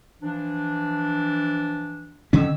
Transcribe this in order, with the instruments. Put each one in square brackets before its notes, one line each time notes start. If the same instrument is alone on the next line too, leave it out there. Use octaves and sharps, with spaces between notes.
[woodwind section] E3 F3 D4
[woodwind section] F2 E6 [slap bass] D3 C#4